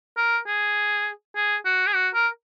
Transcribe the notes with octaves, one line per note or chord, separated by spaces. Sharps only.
A#4
G#4
G#4
F#4
G#4
F#4
A#4